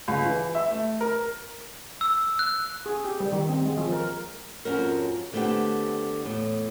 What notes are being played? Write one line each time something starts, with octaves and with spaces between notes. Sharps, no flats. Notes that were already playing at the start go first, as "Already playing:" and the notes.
C#2
E3
E5
A3
A#4
E6
F#6
G#4
G4
G3
D#3
C4
G#3
F3
A#4
F2 G#2 C#4 F#4 A#4
D3 A3 B3 C4 G4
E2 A2